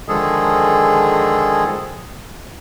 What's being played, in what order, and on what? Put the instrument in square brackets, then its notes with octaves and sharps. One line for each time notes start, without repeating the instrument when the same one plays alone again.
[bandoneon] D3 D#3 F3 G#3 G#4 A4